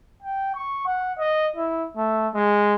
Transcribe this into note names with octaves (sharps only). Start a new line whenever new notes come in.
G5
C#6
F#5
D#5
E4
A3
G#3